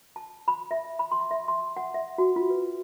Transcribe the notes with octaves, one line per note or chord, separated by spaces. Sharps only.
A5
B5
E5
B5
C6
E5
C6
F#5
E5
F#4
F4
B4